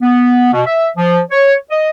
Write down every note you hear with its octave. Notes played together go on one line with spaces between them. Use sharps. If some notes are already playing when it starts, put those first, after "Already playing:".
B3
B2
E5
F3
C#5
D#5